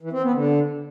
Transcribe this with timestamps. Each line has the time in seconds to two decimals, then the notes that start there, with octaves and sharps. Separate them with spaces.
0.01 E3
0.12 C4
0.23 B3
0.34 D3